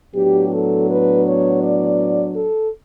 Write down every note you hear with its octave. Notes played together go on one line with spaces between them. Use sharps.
A2 F#3 B3 D4 G4
A4
B4
C#5
D5
A4